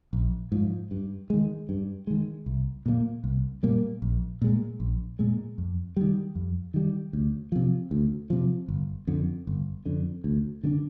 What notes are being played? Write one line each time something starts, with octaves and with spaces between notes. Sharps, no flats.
A#1
G#2 F3
G2
D#3 G#3
G2
D#3 G#3
C2
A#2 G3 A#3
C2
A#2 G3 A#3
A#1
A#2 G#3
A#1
A#2 G#3
F2
D#3 G3
F2
D#3 G3
D2
C3 F3
D2
C3 F3
G1
F2 D3
G1
F2 D3
D2
D3 G#3 D4